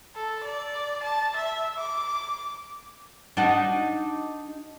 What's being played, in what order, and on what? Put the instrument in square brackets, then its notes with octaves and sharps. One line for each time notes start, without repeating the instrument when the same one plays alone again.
[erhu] A4
D5
A5
E5
D6
[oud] D4 D#4 F#4